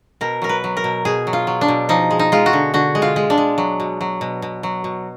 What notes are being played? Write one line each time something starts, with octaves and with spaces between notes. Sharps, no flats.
B2 A#4
F#3 A#4
B4
F#3
A#4
B2
B2 G#4
F#3
F4
F#3
D4
B2
F3 D#4
G#3
D#4
G#3 F4
F#4
D3
D3 F#4
G#3
F4
G#3
D4
G#3
F#3
B2
F#3
B2
B2
F#3
B2